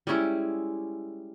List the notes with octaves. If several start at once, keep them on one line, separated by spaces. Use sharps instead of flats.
G3 G#3 C#4 E4